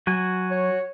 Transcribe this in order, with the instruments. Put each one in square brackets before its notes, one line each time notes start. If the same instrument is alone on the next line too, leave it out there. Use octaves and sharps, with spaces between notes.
[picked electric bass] F#3 [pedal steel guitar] F#4 G#5
[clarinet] C#5